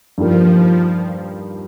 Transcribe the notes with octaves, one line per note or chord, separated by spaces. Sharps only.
G2 D#3 F3 A#3 F4